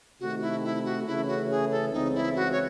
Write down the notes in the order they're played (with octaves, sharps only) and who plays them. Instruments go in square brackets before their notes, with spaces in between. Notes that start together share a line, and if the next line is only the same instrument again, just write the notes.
[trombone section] C3 D#3 A3 [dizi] F#4
[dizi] E4
E4
F#4
[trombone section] C#3 E3 A3 C#4 [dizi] E4
[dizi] F#4
G#4
A4
[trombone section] C#2 C#3 E3 C4 [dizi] D#4
[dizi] E4
F#4
C#5